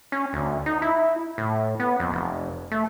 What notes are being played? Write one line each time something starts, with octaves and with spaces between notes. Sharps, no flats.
C#4
D2
D#4
E4
A2
B3
F2
F1
A3